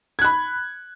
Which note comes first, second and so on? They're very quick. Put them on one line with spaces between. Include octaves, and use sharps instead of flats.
G#6 F#6 B5